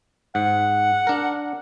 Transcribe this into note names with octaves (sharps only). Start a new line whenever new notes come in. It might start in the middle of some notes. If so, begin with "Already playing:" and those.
G#2 F#5
D4 A#4